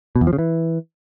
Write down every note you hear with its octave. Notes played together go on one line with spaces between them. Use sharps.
B2
E2
F3
C#3
E3